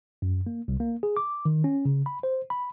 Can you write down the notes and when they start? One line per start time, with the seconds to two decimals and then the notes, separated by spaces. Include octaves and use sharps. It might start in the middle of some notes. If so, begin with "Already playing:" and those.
0.22 F#2
0.47 A#3
0.68 C2
0.80 A#3
1.03 G#4
1.17 D6
1.45 D#3
1.64 C#4
1.85 C#3
2.06 B5
2.23 C5
2.50 B5